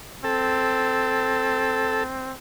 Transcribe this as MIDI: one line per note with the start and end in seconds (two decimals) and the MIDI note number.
0.24 2.35 60
0.24 2.04 69